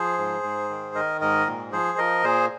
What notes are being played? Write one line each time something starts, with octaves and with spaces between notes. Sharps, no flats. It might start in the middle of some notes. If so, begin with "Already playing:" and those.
Already playing: F3 G#4 C5
G#2
G#2
D#3
D#3 A#4 D#5
G#2 A#4 D#5
A#2
F3 G#4 C5
F3 A#4 D#5
A#2 G#4 C5